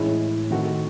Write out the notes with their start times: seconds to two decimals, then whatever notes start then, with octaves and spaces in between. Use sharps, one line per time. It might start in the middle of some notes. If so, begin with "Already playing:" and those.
Already playing: A2 E3 G#3 C#4 E4
0.51 D#3 A3 C4 F#4